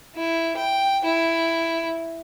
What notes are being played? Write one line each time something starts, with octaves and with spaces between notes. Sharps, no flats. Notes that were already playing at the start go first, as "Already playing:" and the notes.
E4
G5
E4